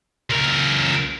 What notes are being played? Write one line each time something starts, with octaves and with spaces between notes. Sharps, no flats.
C#2 A#4